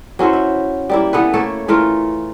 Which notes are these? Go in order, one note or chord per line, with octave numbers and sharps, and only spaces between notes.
F#3 C#4 E4 C5
E5
G3 A#3 E4
E3 B3 A4 B4
A3 A#3 A4 C#5
E3 A3 F4 A#4